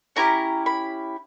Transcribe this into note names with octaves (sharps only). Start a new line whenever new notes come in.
C#4 E4 G4 A#5
B5